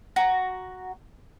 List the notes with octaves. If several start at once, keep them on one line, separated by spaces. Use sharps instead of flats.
F#4 A#5